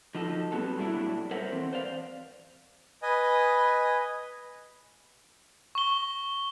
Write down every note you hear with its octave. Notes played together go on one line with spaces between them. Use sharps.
F3 D#4 F#4 A4
F#3 G3 B3 C4 F#4 A4
A#2 F#3 G3 A3 D4 E4
A4 A#4 C5 C#5 E5 F#5
E3 C4
C5 D5 F5
B4 D#5 G#5
C#6 G7